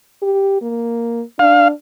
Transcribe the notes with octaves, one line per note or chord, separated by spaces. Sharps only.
G4
A#3
D4 F5